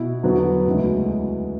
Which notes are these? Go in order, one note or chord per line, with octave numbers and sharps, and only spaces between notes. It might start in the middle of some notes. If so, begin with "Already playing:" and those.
Already playing: B2 E4
E2 D3 F#3 B3 F#4
D2 C#3 E3 G#3